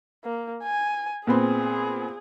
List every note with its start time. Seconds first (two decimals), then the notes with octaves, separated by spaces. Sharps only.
0.24 A#3
0.63 G#5
1.27 A#2 B3 C4 G#4